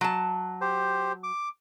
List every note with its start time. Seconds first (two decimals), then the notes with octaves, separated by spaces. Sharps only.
0.01 F#3 A5
0.61 G4 C5
1.23 D6